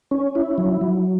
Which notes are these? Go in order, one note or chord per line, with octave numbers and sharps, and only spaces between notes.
C#4
E4
F#3
F#3